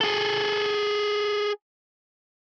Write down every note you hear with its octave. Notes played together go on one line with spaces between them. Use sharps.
G#4 A4